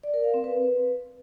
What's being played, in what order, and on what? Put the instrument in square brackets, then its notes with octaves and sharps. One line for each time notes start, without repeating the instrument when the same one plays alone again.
[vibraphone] D5
A#4
F5
C4
B4